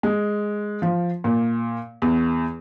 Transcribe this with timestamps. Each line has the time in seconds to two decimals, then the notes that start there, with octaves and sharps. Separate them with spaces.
0.03 G#3
0.82 F3
1.24 A#2
2.02 E2